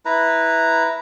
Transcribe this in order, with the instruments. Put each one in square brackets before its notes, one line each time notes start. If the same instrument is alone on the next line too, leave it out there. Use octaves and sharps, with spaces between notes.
[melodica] E4 B4 A#5